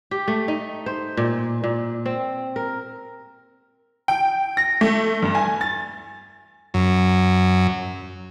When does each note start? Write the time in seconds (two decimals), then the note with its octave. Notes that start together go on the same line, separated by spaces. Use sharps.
0.11 G4
0.28 A3
0.48 D#4
0.86 C5
1.17 A#2
1.64 A#2
2.06 C4
2.56 A#4
4.08 G5
4.57 A#6
4.81 A3
5.22 G2
5.35 G#5
5.61 A6
6.74 F#2